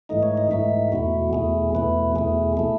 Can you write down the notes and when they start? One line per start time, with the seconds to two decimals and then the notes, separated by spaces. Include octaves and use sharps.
0.09 G#2 E3 A3 D#4 D#5
0.23 C#5
0.38 D#5
0.51 G#2 E3 A3 D#4 E5
0.92 E2 B2 A3 E4 F#4
1.33 E2 B2 A3 E4 G#4
1.75 E2 B2 A3 E4 B4
2.16 E2 B2 A3 E4 G#4
2.57 B2 A3 E4 A4